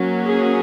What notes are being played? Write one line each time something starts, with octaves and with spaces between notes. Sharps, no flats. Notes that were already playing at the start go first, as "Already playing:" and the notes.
Already playing: F#3 A#3 C#4
G#4